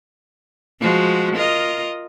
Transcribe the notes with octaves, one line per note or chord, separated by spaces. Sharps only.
F3 G#3 F#4
F4 A#4 D#5